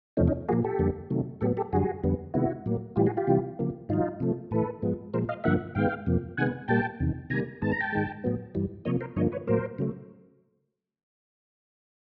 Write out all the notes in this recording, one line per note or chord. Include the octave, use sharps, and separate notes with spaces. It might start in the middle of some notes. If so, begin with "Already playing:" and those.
E2 C3 F3 A3 C#4 D#4
C#4 D#4
A#2 F3 A#3 F#4 G#4
G4 A4
F2 D3 G3 A#3
C3 D#3 F#3 A3
A2 F#3 B3 G4 A4
G4 A4
F#2 D3 G3 F#4 G#4
F2 D3 G3 B3
C3 D#3 G#3 B3 E4 F#4
A2 F#3 A#3
A2 E3 G3 F4 G4
F#4 G#4
F4 G4
C3 E3 G3
C#3 F3 A#3
G#2 D#3 F#3 D#4 F4
C3 F3 A3
A2 E3 A3 A4 B4
G#2 F3 G#3 B3
A#2 F3 G#3 A#4 C5
D#5 F5
G2 D3 F3 A#3 E5 F#5
G#2 D#3 G#3 B3 F5 G5
F2 C3 F3 A#3
C3 D#3 G#3 B3 F#5 G#5
A#2 G3 A#3 G5 A5
E2 C3 D#3
C3 D#3 G3 A#3 G#5 A#5
G#2 D#3 G#3 B3 A5
A#5
G5 A5
G#2 D#3 G#3
A2 F#3 B3
G2 E3 G3
C3 F3 A#3 C#5 D#5
A#4 C5
G2 D3 F3 A#3 C#5 D#5
B4 C#5
A2 F#3 A#3 A#4 C5
C#3 F#3 A3